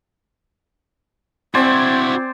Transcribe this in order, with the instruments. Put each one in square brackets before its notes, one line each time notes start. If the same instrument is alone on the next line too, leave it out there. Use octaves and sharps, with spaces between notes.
[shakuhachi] C4 [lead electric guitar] E4 F#4 [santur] C5 D5 G#5